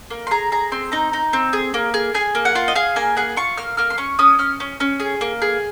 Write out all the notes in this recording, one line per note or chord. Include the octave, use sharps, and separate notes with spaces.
A#3
C6
G#4 A#5
G#4 A#5
C4 C6
D#4 A#5
D#4
C4
G#4
A#3
G#4
G#4 G#5
A#3
F#5
F4
D#5
G#4 F5
A#3 G#5
G#4 F#5
F4 C#6
A#3 F6
A#3 F6
C6
C#4 C#6
C#4 D#6
C#4 F6
C#4
C#4
G#4
A#3
G#4